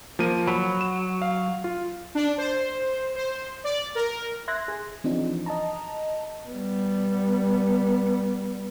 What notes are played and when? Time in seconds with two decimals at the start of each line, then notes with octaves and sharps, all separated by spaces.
0.19 F3 A#3 D#7
0.48 F#3 B5
0.81 E7
1.22 F5
1.64 F4
2.15 D4
2.38 C5
3.16 C5
3.64 D5
3.95 A#4
4.48 E5 C6 F#6 G#6 A#6
4.68 G#4
5.04 E3 F3 C4 D4 D#4 F4
5.46 D#5 A5 A#5
6.49 G3 B3